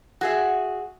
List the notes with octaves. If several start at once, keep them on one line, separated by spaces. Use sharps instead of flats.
F#4 G#4 E5